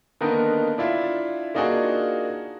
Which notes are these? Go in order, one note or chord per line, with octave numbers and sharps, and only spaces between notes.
D3 D#3 A#3 B3 D#4 A#4
D4 E4 F4 E5
A#3 D4 D#4 F4 F#4 G#4